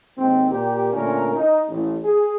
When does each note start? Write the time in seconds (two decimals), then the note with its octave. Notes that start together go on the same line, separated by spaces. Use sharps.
0.18 D#2 G#2 D#3 C4
0.51 A#2 G4 A#4
0.93 A#2 D3 A3 C#4 F4 A#4
1.34 D#4
1.68 A1
2.04 G#4